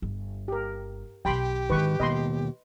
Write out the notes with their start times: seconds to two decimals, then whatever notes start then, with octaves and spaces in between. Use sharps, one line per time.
0.02 G1
0.48 G4 A#4
1.25 B1 D#3 G4 G5 B5 C6
1.70 G#2 D3 D#3 C#4 B4 C#6
2.00 D#2 B2 A#3 D#5 B5 C6